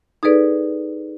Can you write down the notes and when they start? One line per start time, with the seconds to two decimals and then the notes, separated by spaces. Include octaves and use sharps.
0.23 D#4 G#4 A4 B4 D5